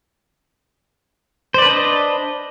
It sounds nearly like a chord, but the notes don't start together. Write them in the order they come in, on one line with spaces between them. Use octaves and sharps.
C5 D5 B4 D4 D#5